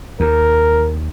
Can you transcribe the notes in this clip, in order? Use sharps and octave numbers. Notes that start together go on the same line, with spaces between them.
D#2 A#4